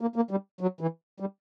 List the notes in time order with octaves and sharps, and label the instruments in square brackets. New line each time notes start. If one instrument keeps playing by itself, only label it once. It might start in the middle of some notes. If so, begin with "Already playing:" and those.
[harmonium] A#3
A#3
G3
F#3
E3
G3